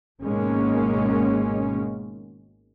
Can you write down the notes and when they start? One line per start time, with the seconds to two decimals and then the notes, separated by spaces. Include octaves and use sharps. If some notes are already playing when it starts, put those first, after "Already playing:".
0.22 G#1 B2 D#3 G#3 A#3 C#4